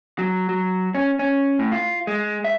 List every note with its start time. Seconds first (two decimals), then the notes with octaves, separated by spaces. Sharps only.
0.19 F#3
0.49 F#3
0.95 C#4
1.19 C#4
1.59 A2
1.72 F4
2.07 G#3
2.44 E5